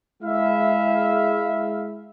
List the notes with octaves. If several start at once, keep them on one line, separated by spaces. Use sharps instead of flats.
G#3 E4 E5 F5